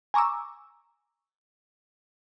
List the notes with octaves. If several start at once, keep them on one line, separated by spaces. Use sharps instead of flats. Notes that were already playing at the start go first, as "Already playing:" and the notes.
G#5 A#5 C#6 D6 E6